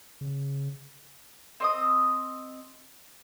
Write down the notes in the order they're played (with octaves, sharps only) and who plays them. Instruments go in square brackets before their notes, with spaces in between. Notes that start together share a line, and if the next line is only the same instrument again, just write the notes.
[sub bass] C#3
[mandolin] C4 D#5 D#6